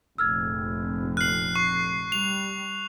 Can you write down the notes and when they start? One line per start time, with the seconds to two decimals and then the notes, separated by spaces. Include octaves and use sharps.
0.18 F1 A#1 F2 E6 F6 G#6
1.17 F6 F#6 C7 F#7
1.56 C#6 C7
2.12 G3 F7